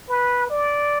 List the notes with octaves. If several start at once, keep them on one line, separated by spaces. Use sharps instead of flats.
B4
D5